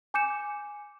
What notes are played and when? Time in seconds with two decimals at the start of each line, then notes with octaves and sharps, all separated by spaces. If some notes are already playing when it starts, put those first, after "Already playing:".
0.14 G#5 D6 G6 C#7 E7